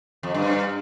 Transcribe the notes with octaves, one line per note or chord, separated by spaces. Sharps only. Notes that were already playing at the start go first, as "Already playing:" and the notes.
F2
G2